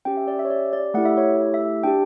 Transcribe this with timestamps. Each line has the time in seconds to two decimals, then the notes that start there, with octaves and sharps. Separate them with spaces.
0.05 C#4 G4 G5
0.17 E5
0.28 D5
0.39 E5
0.45 C#5
0.50 D5
0.73 D5
0.94 A3 E4 G4 F#5
1.05 E5
1.17 C#5
1.54 E5
1.84 D4 G4 G5